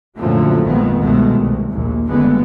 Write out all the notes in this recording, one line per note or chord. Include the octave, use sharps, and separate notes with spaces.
F#2 A#2 D3 F3 F#3 A3
A#1 F2 D#3 G#3 A3 B3
C2 B2 D#3 G#3 A3
C2
A#1 D#2
F#1 D3 E3 G3 G#3 B3